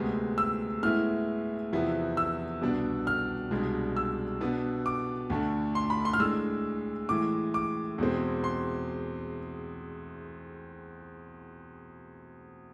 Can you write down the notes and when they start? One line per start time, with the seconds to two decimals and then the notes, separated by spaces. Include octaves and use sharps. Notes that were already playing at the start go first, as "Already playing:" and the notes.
Already playing: D2 C3 G#3 B3
0.38 E6
0.83 A2 G#3 B3 E4 F6
1.72 E2 C3 F3 B3 E4
2.17 E6
2.62 C2 B2 B3 D4
3.07 F6
3.51 C2 B2 G#3 D4
3.97 E6
4.41 B2 B3 D4
4.86 D6
5.30 D2 D3 A3 D4
5.75 C6
5.90 B5
6.05 C6
6.13 F6
6.19 A2 G#3 D4 E6
7.09 A2 E3 G#3 D6
7.54 D6
7.98 E2 B2 G#3 C4
8.44 C6